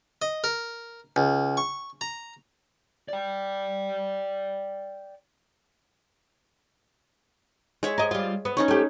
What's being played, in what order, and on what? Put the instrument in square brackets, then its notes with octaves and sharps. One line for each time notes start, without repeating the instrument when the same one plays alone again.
[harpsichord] D#5
A#4
C#2
C#6
A#5
[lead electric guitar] D5 G5
[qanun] G#3 C#5 E5
[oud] A#4 D#5
G3 F4
B3
[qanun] C#4 D#4 C#5
[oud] A3 G4